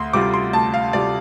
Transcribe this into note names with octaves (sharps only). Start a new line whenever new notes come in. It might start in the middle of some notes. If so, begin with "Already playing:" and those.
Already playing: D2 C6
C3 G3 F4 D6
C6
D2 A5
F5
C3 G3 F4 D5